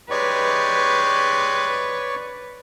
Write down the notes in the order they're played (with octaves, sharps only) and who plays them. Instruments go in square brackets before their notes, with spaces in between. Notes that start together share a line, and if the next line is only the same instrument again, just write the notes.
[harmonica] G#3 D#4 G4 [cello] B4 [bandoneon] C#5 D5 C#6